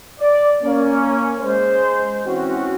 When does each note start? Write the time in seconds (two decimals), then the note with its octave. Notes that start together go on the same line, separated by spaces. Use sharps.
0.19 D5
0.63 A#3 C#4
1.39 G#3 C5
2.26 E3 C4 C#4 F#4